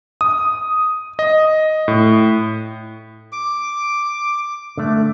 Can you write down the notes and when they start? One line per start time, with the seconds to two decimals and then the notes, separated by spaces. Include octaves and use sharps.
0.21 D#6
1.19 D#5
1.88 A2
3.32 D6
4.78 D3 A3